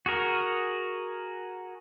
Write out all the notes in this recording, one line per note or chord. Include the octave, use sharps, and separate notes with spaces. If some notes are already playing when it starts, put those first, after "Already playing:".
F#4 G#4 A#4